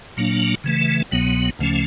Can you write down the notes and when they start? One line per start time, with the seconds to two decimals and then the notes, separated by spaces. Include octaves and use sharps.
0.17 A#2 F#3 A#3 D4
0.64 C#3 E3 A3
1.12 C2 B2 F#3 B3
1.59 D2 C#3 F3 A3 C#4